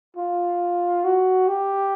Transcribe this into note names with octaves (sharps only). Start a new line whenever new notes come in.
F4
F#4
G4